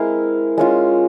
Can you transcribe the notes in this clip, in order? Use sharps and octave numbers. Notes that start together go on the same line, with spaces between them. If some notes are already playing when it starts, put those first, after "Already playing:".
Already playing: G#3 C4 E4 A#4 F5
G#3 C#4 F4